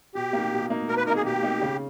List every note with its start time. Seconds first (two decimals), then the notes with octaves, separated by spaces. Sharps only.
0.15 B2 G4
0.33 A#3 D#4
0.51 B2
0.70 A#3 D#4
0.88 B2 A#4
0.97 B4
1.07 A#3 D#4 A#4
1.16 G#4
1.25 B2 G4
1.43 A#3 D#4
1.62 C#3